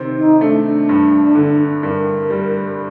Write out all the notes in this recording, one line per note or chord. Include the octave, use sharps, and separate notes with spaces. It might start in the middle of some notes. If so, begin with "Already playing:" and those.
Already playing: C3 D#3 C4
D#4
A3 D4
D4
G2
D3
G2 A#4
G3